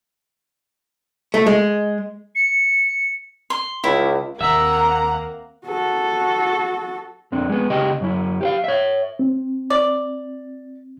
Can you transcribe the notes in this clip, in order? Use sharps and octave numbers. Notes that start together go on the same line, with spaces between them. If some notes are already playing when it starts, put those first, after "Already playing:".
A3
G#3
C#7
C6
C#2 E4
D#2 A#3 C4 E5 F#5 A#5
F#4 A4
F2 C4 D4
G#3 B3
C#2 C#3 G4 D#5
F#2 F#3 E4
G4 C5 F5
C#5 E5
C4
D5